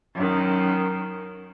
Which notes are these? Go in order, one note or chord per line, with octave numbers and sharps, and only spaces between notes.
F#2 D#3